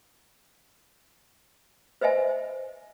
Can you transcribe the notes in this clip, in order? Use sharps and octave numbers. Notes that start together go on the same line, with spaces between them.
B4 C5 D#5 E5 G#5